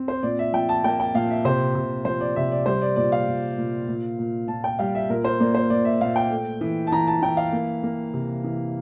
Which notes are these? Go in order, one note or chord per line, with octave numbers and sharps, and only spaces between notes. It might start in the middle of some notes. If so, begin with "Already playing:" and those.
Already playing: C4
C5
A#2 D5
E5
F3 G5
A5
A#3 G5
G5
A#2 F5
E5
C3 C5
C3
F3 C5
D5
C3 E5
D5
G3 C5
D5
A#2 D5
F5
A#2
A#2
A#2
A#2
A#2 A5
G5
G3 F5
E5
A#2 A#4
C5
A#3 D5
C5
A#2 D5
E5
A#2 F5
G5
A3
E3
A5
E3 A#5
A5
E3 G5
F5
A#3
A#3
C3
E3